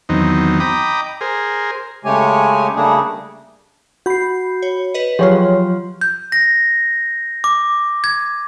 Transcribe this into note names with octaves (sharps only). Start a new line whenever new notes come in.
E2 D#3 F#3 B3 C4 D#4
D#5 G5 A#5 B5 D6 D#6
G#4 A#4 C5
C#3 G#3 A3 G4 C#5 G#5
C#3 G3 A3 A#3 D4 G#4
F#4 B5 G6 C7
C#5
B4 D#5
F3 F#3 F4 G4 G#4 C#5
G6
A#6
D6
G#6